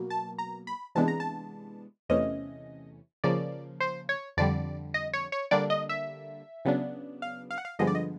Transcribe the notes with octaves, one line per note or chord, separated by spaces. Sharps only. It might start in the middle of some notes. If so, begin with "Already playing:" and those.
Already playing: B2 F#3 A#3
A5
A#5
B5
C3 E3 G#3 B3 D4 A5
A#5
A5
E2 C3 E3 A3 C#4 D#5
C#3 F3 A#3 D5
C5
C#5
F2 D3 G3 D5
D#5
C#5
C#5
D3 G3 A#3 D4 D5
D#5
E5
C#3 F#3 B3 D4
F5
F5
F#5
F5
G2 D3 F3 G#3 B3 D#5
D5
D#5